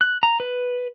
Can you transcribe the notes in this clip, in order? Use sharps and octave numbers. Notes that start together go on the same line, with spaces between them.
F#6
A#5
B4